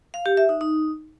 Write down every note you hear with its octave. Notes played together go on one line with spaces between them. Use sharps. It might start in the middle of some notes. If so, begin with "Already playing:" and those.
F5
G4
E5
D#4
D#4